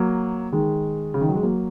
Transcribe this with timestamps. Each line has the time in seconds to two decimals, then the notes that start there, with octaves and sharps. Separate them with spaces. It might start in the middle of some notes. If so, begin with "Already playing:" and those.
Already playing: F#3 A#3
0.52 D#3 G#3
1.14 C#3
1.21 D#3
1.29 F#3
1.35 G#3
1.43 F#3 A#3